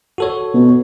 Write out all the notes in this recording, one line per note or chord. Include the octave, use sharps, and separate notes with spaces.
F#4 A4 C#5
B2